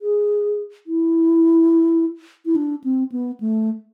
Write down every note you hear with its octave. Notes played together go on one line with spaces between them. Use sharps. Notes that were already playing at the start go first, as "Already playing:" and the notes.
G#4
E4
E4
D4
C4
B3
A3